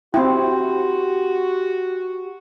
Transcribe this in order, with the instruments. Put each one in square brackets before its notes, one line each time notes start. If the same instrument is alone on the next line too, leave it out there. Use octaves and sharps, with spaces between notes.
[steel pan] C4 E4 [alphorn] F#4 [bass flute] G4 [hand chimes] G5 C6